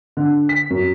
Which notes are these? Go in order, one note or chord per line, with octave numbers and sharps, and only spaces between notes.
D3
B6
F#2